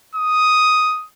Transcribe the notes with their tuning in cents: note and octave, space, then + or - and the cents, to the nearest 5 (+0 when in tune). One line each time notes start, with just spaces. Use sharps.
D#6 +5